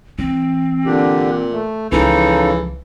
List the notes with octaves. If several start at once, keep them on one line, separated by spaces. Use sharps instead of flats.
E3 C4
A#2 D3 D4 G4
A3
C#2 C#3 E3 F3 D#4 A4